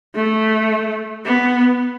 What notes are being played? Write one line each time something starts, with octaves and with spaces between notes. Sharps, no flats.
A3
B3